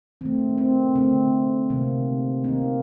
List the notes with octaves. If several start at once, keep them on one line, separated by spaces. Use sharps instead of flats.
D#3 A3 C4
C4
D3 A3 C4
C3 D#3 A#3
D#3 A#3 C4 D#4